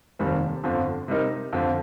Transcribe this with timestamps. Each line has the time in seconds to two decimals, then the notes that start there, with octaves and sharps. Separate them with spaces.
0.19 F1 D#2 D#3 G3 C4
0.64 G1 F2 D3 F3
1.08 C3 G3 C4 D#4 A#4
1.53 F2 D3 F3